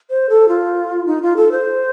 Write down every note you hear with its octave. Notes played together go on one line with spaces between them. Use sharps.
C5
A4
F4
D#4
F4
A4
C5